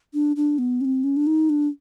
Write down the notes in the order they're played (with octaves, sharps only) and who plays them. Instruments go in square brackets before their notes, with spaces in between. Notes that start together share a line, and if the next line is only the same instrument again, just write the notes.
[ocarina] D4
D4
B3
C#4
C4
C#4
D4
D#4
D4